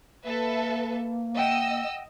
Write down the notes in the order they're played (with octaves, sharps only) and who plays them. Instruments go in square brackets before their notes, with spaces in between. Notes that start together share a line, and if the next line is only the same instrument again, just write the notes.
[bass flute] A#3 [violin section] A4 B4 E5
[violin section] D#5 E6 [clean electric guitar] E5 F#5 G5